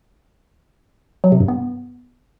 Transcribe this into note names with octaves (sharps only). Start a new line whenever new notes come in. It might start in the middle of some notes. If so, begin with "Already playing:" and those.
F#3
C3
G2
B3